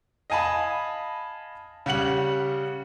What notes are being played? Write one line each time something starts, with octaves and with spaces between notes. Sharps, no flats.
D#5 F5 G#5 A5 B5
C#3 G3 F#5 F#7